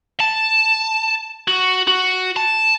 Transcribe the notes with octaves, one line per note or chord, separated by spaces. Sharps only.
A5
F#4
F#4
A5